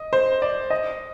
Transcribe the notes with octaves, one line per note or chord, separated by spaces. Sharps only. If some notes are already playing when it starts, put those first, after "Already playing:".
Already playing: D#5
C5
D5
D#5